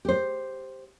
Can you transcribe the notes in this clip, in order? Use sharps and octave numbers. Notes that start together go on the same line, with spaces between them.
G4 C5